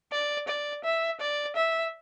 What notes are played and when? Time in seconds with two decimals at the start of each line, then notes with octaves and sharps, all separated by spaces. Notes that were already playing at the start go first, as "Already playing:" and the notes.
0.13 D5
0.48 D5
0.85 E5
1.21 D5
1.56 E5